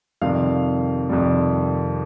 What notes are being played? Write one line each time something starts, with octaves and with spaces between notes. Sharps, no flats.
F2 C3 D#3 G3 F5
F2 C3 D#3 G3